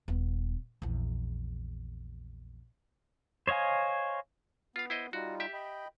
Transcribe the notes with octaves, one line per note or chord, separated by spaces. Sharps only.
D#1 B3
A#1 E2
C5 C#5 D#5 F5 G#5
B3 F4 F5
E4 C5 D#5
G3 D#4 F4 F#4
G4 E5
D#5 G5 B5